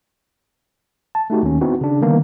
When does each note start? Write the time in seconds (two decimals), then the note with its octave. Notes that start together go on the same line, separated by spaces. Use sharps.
1.15 A5
1.30 A3 D#4 F#4 G4
1.43 D#2 C#4
1.61 B3 C4 D#4 E4 F#4
1.81 C#3 D4
2.01 D3 D#3 G3 A#3 B3 D#4